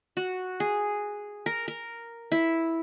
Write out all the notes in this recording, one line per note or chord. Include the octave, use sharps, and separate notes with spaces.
F#4
G#4
A#4
A#4
E4